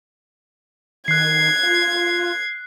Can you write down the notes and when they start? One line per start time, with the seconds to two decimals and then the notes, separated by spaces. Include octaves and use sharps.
1.08 D#3 F#6 G#6 C7
1.63 F4